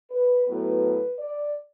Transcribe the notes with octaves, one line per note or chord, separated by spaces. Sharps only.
B4
A2 F#3 B3 B4
D5